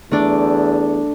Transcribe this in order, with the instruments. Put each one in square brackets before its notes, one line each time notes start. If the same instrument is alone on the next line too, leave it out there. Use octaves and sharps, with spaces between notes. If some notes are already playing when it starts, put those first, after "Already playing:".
[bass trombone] E2 [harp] A3 D4